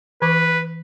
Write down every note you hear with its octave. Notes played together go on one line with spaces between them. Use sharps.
E3 B4 C#6 D6